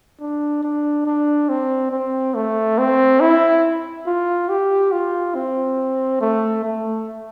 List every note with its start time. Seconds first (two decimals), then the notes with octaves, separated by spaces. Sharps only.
0.20 D4
0.63 D4
1.06 D4
1.49 C4
1.91 C4
2.35 A3
2.78 C4
3.21 E4
4.06 F4
4.49 G4
4.92 F4
5.35 C4
6.21 A3
6.64 A3